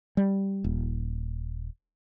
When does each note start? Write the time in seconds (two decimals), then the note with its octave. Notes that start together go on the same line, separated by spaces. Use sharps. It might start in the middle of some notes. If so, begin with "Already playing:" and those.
0.17 G3
0.64 D#1